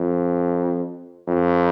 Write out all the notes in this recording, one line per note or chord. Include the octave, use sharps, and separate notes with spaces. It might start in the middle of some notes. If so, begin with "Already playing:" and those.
Already playing: F2
F2